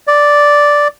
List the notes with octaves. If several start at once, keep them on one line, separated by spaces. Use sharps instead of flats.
D5